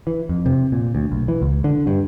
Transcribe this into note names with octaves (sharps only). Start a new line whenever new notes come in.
E3
F2
C3
A#2
D2
B1
E3
C#2
D3
G2